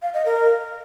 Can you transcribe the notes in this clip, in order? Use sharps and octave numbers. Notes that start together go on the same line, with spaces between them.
F5
D#5
A#4